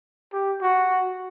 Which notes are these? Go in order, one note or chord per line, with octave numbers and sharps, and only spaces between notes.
G4
F#4